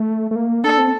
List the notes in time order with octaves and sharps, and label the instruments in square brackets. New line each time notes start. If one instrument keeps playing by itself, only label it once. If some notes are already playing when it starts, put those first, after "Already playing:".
Already playing: [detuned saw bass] A3
A3
A#3
[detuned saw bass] D4 [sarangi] A4
[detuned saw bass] C4